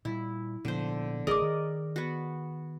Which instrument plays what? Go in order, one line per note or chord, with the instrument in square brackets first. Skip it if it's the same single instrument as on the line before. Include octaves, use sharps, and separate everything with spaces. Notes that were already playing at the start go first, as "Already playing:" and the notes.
[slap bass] A#2 G3 [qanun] E4
[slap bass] A#2 F3 B3 [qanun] D3 C5
[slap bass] A1 [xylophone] G#4 D6 [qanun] A#4 D5 D#5
[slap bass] D#3
[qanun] B3 F#4